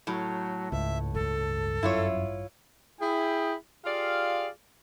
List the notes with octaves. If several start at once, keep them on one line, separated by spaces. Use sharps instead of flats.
A2 F#3
C#2 G#2 E5
A1 G2 A4
F#2 E4 F4 C#5
E4 G#4 G5
F4 G4 G#4 D5 F5